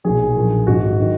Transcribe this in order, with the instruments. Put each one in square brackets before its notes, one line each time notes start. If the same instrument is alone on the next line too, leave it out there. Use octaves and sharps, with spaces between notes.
[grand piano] B1 A#2 F#3 A#3 G#4
A#1 A#2 F3 A#3
G#1 G#2 F#3 F#4
D#3